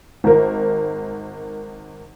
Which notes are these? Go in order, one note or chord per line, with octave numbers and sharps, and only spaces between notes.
G#1 A#4